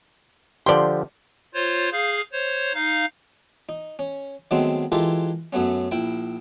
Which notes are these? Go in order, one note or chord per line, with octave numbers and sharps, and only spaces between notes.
D3 F3 G4 D5 C6
F4 C5 C#5
G#4 F5 G6
C5 C#5
D#4 F5
D#4
C#4
D#3 F#3 G#3 A3 B3 C4
E3 G#3 F4 G4 A4 A#4
F#2 F#3 A3 B3 C#4
A#1 E4 G5